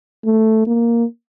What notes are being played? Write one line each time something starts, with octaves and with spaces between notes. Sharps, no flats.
A3
A#3